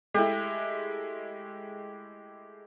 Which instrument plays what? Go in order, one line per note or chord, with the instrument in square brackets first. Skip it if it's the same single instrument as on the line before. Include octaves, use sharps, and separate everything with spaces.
[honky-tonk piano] G#3 A3 E4 [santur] G4